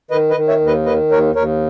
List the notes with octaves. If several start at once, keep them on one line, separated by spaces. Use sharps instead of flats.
D#3 B4 D#5
B4 D#5
D#3
C#5 E5
D#2
B4 D#5
D#3 B4 D#5
D#2 A#4 C#5
D#2 A#4 C#5